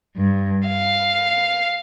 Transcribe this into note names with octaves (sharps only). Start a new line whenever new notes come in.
G2
F5